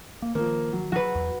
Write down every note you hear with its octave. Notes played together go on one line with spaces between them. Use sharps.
A#3
D#3 F3 A#3
F#3
F#3 F#4 B4
E2